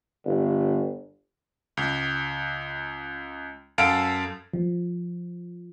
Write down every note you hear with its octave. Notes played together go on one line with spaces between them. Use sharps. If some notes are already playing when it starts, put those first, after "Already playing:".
G1
C#2
F#2 A4 F5 D7
F3